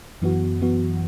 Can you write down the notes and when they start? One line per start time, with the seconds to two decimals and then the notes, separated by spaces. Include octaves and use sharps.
0.21 F#2 E3 B3 F#4
0.61 F#2 E3 B3 F#4